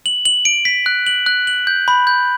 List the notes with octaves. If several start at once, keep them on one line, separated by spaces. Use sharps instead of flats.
F#7
F#7
D7
B6
F#6
F#7
F#6
F#7
G6
B5
G6